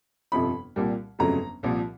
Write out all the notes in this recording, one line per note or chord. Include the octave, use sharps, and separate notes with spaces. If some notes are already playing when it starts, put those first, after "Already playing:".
G1 F2 C3 F3 B5
C2 A#2 G3 A#3
G1 F2 C#3 F#3 A3 A#5
C2 A#2 F3